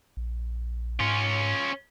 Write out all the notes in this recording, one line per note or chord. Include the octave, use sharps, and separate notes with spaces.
A#1
G#2 C#4 F4